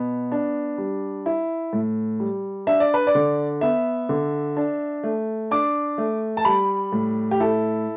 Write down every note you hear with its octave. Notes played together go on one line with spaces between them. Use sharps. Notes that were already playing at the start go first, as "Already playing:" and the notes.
Already playing: B2 B3
D4
G3
E4
A2
G3
D4 E5
D5
B4
D5
D3
B3 E5
D3
D4
A3
D4 D6
A3
A5
G3 B5
A2
G4
E4 A4